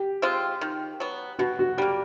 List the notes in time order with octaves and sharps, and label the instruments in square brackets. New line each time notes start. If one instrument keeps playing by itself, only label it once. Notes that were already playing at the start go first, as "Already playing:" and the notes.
Already playing: [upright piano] G4
[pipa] G#3 C4 F4
D#3
F#3 B3
[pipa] B2 [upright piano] F#4
[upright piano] F#4
[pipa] G3 A#3 [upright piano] G4